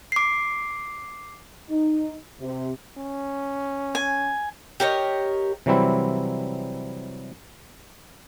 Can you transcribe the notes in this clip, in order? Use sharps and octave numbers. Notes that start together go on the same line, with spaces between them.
D6 C7
D#4
C3
C#4
G#5
G4 A#4 C#5 D#5
C3 E3 F#3 G3 C4 E4